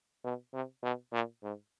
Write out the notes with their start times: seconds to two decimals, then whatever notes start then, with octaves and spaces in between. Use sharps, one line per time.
0.24 B2
0.53 C3
0.83 B2
1.13 A#2
1.43 G#2